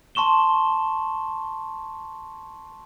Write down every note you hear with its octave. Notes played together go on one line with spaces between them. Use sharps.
A5 C6 C#6 E7 G7